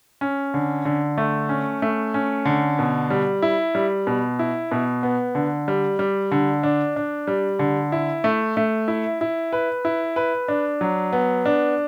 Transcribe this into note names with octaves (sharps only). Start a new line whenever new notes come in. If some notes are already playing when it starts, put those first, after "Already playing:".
C#4
D3
D3
A3
C#4
A3
C#4
D3
B2
G3
E4
G3
B2
E4
B2
B3
D3
G3
G3
D3
D4
D4
G3
D3
E4
A3
A3
E4
E4
B4
E4
B4
D4
F#3
B3
D4